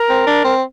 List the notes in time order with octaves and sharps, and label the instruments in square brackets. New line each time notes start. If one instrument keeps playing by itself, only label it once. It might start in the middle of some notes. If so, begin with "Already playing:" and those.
Already playing: [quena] A#4
[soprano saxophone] C4
D4
C4